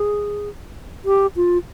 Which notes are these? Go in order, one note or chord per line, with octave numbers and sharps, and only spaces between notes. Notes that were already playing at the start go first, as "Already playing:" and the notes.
Already playing: G#4
G4
F4